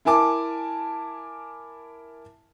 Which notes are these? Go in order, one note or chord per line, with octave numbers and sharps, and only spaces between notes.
E4 A#4 G#5 A5 D6